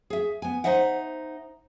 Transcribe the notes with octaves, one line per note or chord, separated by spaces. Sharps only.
G#4 E5
B3 G#5
D#4 C5 D#5 E5 F#5